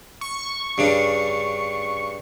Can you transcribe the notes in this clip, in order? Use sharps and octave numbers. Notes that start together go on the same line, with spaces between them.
C#6
G2 C#3 D4